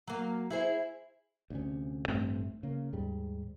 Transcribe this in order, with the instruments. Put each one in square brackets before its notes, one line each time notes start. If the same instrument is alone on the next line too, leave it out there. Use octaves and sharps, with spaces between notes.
[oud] F#3 A#3
E4 G#4 C5
[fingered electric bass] D2 C3 C#4
A1 G2 A3 C4
C#3 A#3
D#2 G#2 G3